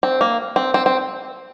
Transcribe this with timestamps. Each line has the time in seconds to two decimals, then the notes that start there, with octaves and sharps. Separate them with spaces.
0.03 C4
0.21 A#3
0.56 C4
0.74 C4
0.86 C4